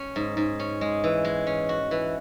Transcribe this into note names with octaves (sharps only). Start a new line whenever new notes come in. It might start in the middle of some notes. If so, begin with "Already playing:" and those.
Already playing: C#4
G#2
G#2
C#4
G#3
E3
G#3
C#4
F#4
E3